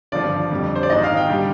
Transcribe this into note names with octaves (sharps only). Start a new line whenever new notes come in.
G#1 G2 D3 F3 D5
F2 D3 G3
C5
D5
A#1 G#2 D#3 D#5
F5
G5
D3 G3